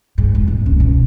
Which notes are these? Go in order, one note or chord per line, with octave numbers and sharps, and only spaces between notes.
G#2
F2
D#1
C#2
B2